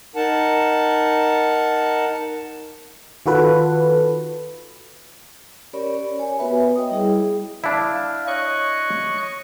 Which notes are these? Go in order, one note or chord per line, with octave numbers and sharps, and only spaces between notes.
D#4 A#4 F#5 A5
D#3 F4 F#4 A4 B4
C#4 G4 A#4 C#5 D5 B5
G4 C#5 G#5
B3 F#4 B4 C#5 E5 B5
D#5 G5 D#6
G3 E4 G#4
D4 E4 F5
C#5 D#5 C#6 F#6